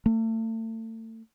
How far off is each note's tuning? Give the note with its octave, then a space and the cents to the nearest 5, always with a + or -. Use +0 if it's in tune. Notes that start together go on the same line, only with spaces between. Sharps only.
A3 +35